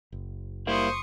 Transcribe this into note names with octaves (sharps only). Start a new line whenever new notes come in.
F#1
G3 A#3 E4 C5 C6 C#6 D#6